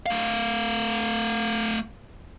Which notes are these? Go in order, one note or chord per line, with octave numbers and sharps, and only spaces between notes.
A3 F5